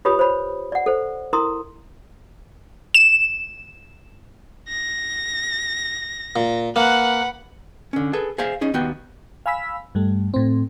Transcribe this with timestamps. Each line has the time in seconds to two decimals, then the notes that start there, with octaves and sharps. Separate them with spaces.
0.05 F4 G4 B4 C#5 B5 D#6
0.19 C5 C#5 B5
0.72 D5 F#5
0.86 A4 C5
1.33 E4 A#4 A#5 C6 D#6
2.94 E7
4.69 A#6
6.36 A#2
6.76 A#3 B4 F#5
7.93 D3 C#4
8.13 G#4 A4 B4
8.38 G#4 C5 E5 F5
8.61 C#4 D#4 G#4
8.74 D#2 B3 F#4 G5
9.46 F5 G#5 B5 E6 B6
9.95 G2 G3 A3
10.34 A2 C4